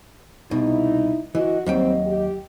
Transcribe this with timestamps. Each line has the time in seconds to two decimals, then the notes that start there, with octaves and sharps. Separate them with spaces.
0.51 C2 B2 D#4 E4
1.35 E3 F#4 D#5
1.66 D#2 F#3 G3 C4 D#5 G5
2.07 G4